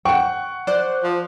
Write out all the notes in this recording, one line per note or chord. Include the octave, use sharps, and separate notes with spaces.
F#5 G5 C#6
C5 D5 F#6
F3